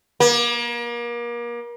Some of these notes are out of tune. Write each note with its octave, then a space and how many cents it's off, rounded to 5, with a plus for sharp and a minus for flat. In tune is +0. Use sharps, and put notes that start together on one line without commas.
A#3 +35